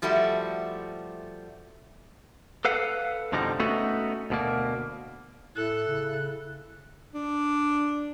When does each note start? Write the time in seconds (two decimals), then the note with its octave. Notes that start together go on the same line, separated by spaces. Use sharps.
0.02 F3 G3 A3 E4 F#4
2.65 A4 B4 F5 F#5
3.32 F2 B2 D3 F3 G3 D#4
3.60 A3 B3 C#4 D#4 F#4 A4
4.30 D2 B2 A#3
5.56 A2 E4 A4 F#6
5.88 C#3
7.14 D4